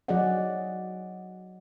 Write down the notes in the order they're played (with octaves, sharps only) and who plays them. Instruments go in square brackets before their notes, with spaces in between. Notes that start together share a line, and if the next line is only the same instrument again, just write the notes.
[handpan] F#3 F#4 G#4 D5 D#5 F#5